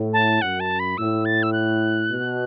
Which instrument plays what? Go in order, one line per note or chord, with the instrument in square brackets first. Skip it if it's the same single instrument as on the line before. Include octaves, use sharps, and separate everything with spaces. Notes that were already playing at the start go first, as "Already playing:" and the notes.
Already playing: [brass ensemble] A2
[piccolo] A5
[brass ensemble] F#2 [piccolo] F#5
[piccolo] A5
B5
[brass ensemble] A2 [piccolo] E6
[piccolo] A6
E6
F#6
[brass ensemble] B2